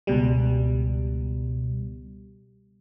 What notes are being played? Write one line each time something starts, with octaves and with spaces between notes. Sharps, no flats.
C#2 B2 G3